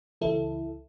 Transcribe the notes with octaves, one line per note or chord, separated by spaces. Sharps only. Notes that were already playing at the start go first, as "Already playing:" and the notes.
C#2 C#3 E3 E4 A4